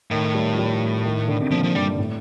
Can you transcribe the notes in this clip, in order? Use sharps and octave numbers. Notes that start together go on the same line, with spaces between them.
A2 D#3
G3
F3
G3
D#3
D3
C3
A#2 F3
F3
G2 G3
A2